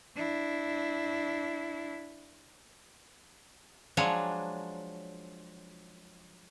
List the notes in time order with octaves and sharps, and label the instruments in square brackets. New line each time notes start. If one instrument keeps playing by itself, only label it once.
[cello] D4 E4
[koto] F3 F#3 G#3 D4 C#5